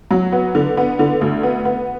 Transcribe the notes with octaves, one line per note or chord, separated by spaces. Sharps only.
F#3
B3
D3
B3
D3
D2
B3
B3